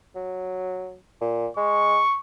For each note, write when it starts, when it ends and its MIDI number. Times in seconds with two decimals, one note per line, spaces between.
0.16 0.96 54
1.21 1.48 46
1.57 2.00 56
1.57 2.20 85